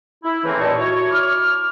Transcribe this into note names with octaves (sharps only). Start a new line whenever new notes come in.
E4
C#3 E3 A3 A#3 C4
D#2 A#2 D#5 A5 C#6
E4 F#4 C#5
D6 F6